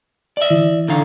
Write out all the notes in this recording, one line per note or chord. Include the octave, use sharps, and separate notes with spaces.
D5 E5
E3
D3 D#4 F5